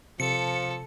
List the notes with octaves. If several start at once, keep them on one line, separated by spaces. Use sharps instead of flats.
C3 F3 A4 C#7